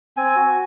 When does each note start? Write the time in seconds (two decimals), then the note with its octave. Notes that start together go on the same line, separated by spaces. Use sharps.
0.17 C4 G#5
0.36 F#4